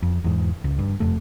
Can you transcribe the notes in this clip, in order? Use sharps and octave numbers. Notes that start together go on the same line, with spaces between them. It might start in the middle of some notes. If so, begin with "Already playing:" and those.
F2
E2 G#2
C#2
G2
F1 F2 A3